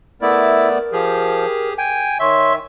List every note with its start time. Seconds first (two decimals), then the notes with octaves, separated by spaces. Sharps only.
0.22 A3 B3 E4 A#4 D5
0.92 F3 G4 G#4
1.78 G5 G#5
2.20 D#3 C#5 E5 C6 C#6